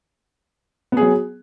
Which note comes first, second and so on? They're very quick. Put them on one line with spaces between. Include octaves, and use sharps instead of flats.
B3 G#4 F#3